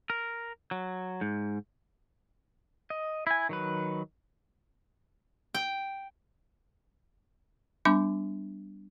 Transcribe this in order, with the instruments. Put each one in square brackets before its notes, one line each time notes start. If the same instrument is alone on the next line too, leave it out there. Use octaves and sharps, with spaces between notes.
[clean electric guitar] A#4
F#3
G#2
[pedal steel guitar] D#5
E4 G#5
D#3 F#3 B4
[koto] G5
[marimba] G3 B3 D4 B5 D6